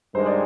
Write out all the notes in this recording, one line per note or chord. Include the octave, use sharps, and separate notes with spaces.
G2 D#3 G#3 C5
D5